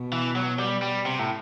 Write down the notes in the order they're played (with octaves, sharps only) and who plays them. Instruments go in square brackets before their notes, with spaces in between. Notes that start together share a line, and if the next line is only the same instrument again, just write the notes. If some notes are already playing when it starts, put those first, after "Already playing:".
Already playing: [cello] B2
[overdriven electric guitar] E3
F#3
G3
G3
C3
A2